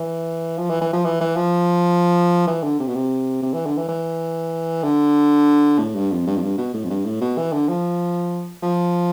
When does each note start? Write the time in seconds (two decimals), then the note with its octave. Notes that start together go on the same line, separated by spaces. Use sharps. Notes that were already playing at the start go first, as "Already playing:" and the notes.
Already playing: E3
0.58 F3
0.70 E3
0.81 E3
0.93 F3
1.05 E3
1.21 E3
1.36 F3
2.47 E3
2.63 D3
2.79 C3
2.87 B2
2.95 C3
3.42 C3
3.54 E3
3.66 D3
3.78 E3
3.89 E3
4.84 D3
5.79 A2
5.95 G2
6.11 F2
6.27 G2
6.36 F2
6.42 G2
6.58 B2
6.74 A2
6.84 F2
6.90 G2
7.06 A2
7.21 B2
7.38 E3
7.53 D3
7.69 F3
8.63 F3